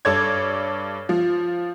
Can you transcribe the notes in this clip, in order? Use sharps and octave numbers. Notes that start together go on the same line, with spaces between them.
G2 A4 C#5 D5 G#6
F3